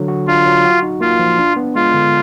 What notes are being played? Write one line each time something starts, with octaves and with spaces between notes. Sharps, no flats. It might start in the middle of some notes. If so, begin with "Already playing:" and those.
Already playing: D3 F#3
F#4
D4 F4
F#3
F#4
D#4
A#3 F4
F3
D4
B3
G#3 F4
D3